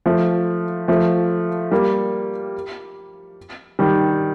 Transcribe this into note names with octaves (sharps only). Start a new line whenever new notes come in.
F3 A3
F3 A3
G3 A#3
D#3 G3